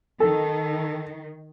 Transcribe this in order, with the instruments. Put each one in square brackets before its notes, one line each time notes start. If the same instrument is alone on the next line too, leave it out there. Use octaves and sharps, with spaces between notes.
[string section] D#3 [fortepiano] A4